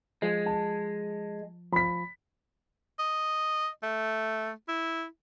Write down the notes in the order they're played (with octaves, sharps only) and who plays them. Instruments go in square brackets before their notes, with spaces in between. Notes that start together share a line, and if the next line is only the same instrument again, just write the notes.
[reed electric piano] F3 [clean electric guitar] G#3
[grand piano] A5
[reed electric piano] F3 [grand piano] B5 B6
[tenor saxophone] D#5
A3
E4